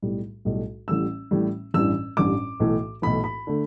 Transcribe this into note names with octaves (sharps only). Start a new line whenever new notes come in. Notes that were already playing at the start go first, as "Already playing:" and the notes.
B1 A2 G3
B1 A2 G3
A1 A2 G3 E6
A1 A2 G3
A1 G2 E3 G3 E6
A1 G2 E3 G3 D6
B1 A2 E3
B1 A2 E3 B5
B5
D3 A3